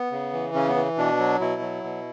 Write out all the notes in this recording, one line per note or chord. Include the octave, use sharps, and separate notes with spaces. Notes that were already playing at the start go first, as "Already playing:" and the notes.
Already playing: B3
C#3
E3
C#3 C#4
B3
E3
B2 D4
F#3
B2 E4
F#3
B2